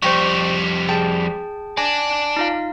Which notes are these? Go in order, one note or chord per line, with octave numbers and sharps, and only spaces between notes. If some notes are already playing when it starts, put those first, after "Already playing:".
F2 G3 C5 G5 C#6
G#4 G5 A5
D5 G#5 A5 A#6
D#4 F4 F5